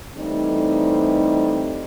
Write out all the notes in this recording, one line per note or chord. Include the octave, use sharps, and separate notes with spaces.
D3 E3 G3 A3 C4 D#4